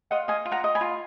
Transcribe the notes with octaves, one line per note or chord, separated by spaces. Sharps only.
F4 D#5 F#5
D#5 F5 G#5
F4
F#5 A#5
D#5
G#5 B5
F4